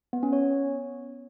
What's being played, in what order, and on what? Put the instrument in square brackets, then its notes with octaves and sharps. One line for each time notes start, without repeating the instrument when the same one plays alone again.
[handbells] B3
C#4
C#5